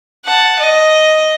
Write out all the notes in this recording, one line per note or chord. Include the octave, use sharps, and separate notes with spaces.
F#5 A5
D#5